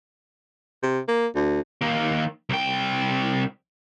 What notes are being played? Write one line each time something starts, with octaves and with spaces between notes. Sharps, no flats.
C3
A#3
D2
D#3 A#3
C2 G5